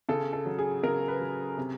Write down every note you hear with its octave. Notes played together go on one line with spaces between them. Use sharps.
C#3 A4
A4
F#3
G#4
C#3 A#4
B4
F#3
C3